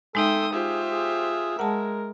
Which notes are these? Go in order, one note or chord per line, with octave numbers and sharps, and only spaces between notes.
G#3 D#4 A4 E5 G5 C6 D#6
F4 G4 G#4 C5 E5
G#4
G#3 A#4 F#5 A5